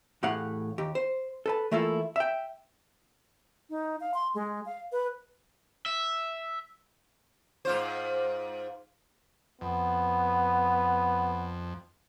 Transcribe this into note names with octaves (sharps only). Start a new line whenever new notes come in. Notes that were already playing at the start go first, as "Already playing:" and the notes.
E2 A2 G4 F5 F#5
D#2 G4
C5
A4 B4 A5
E3 A3 A#3 E4 F4 A4
E5 G5
D#4
F5
C6
G#3
F5
B4
E5
G#2 F4 C5
F2 B3